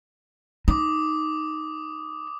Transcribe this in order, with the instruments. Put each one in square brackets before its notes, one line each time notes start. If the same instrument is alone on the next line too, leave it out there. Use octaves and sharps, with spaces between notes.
[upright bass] D#4 [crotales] D6 D#6